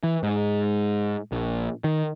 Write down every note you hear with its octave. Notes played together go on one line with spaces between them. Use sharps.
E3
G#2
A#1
D#3